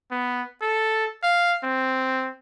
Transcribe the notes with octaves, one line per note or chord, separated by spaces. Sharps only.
B3
A4
F5
C4